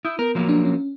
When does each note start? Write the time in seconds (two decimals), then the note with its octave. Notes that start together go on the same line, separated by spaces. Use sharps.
0.05 E4 D#6 G6
0.19 B3 A#4
0.35 F3 F#3 A#3
0.49 D4
0.65 C#4